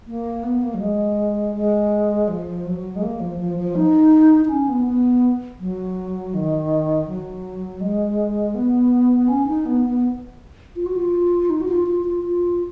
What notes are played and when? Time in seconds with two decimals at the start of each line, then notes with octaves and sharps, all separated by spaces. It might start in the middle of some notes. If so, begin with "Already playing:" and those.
0.07 A#3
0.43 B3
0.63 A#3
0.74 F#3
0.80 G#3
1.55 G#3
2.28 F3
2.66 F#3
2.96 G#3
3.02 A#3
3.20 F3
3.38 F3
3.57 F3
3.75 D#4
4.45 D#4
4.49 C#4
4.69 B3
4.87 B3
5.59 F#3
6.34 D#3
7.08 F#3
7.81 G#3
8.55 B3
9.28 C#4
9.47 D#4
9.65 B3
9.85 B3
10.76 F4
10.86 F#4
10.96 F4
11.50 D#4
11.61 F#4
11.68 F4
11.86 F4
12.05 F4
12.23 F4